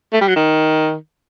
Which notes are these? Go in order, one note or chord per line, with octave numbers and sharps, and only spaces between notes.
A3
G3
F#3
D#3